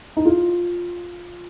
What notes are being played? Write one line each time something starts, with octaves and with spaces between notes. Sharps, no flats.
D#4
F4